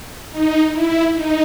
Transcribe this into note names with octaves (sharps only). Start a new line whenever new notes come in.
D#4
E4
D#4